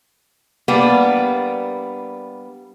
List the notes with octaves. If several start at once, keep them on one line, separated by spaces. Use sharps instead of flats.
G3 A#3 B3 D4